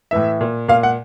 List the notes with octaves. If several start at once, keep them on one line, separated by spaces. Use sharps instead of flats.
A2 E3 E5
A#2
A#2 F5
F#5